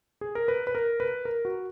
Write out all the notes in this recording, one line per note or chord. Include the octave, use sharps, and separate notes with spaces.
G#4
A#4
B4
B4
A#4
B4
A#4
F#4